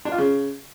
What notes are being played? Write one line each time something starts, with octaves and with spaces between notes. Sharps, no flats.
D4
F4
C#3